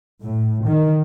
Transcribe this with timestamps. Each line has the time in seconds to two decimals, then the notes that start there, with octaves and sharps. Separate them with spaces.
0.22 A2
0.65 D#3